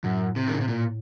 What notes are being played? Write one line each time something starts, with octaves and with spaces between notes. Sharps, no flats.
F#2 A2
C3
D#3
C#3
C3
A#2